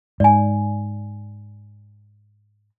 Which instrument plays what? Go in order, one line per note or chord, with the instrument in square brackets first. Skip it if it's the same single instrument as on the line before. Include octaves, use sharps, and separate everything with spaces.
[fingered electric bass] G#2 [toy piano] D5 G#5